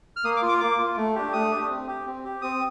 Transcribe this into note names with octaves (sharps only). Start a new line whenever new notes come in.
F6
A#3 D#6
D6
F4
D6
A#3 D6
F4
A3
D4 G4
A3 D#6
D4 G4
C4
G4
C4
G4
C4 D#6